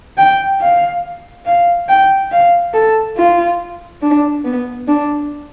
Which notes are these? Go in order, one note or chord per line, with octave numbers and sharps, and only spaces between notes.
G5
F5
F5
G5
F5
A4
F4
D4
B3
D4